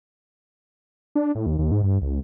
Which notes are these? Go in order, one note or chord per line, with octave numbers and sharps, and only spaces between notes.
D4
A2
D#2
D#2
G#2
G2
C#2